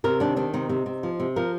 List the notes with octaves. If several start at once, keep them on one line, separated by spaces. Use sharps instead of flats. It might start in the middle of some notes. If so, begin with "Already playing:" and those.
C3 A#4
D#3 D4
D#3 D4
C3 D#4
C3
C3
F3
C3
F3 A#4